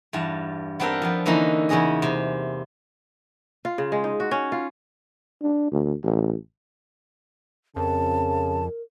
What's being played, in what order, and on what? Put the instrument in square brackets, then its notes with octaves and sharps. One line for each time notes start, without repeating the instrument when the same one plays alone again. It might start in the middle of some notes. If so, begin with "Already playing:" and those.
[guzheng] E2 G2 A5
B3 C4 D4 G4 A4 A#4
F3 B3
D3 E3 A#3 C#4 D#4
E2 C#3 C#4 G#4 D#5
C3
[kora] F4
C#3
G#3
D#4
F#4
C#4
F4
[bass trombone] D4
D2
A1
[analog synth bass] F2 [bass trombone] C#3 [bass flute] A#4 [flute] A5